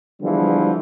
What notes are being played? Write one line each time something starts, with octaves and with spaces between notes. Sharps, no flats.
D3 E3 F3 G3 G#3 B3